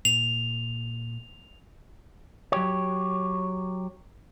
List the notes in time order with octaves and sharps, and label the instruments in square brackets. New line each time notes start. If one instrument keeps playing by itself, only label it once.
[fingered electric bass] A#2 [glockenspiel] F7
[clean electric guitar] F#3 G4 C#5